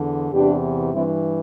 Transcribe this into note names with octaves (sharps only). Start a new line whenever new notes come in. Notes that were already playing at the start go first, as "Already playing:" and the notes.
Already playing: E2 D3
E2 C3 E3 D4 G4
G2 E3 C4 E4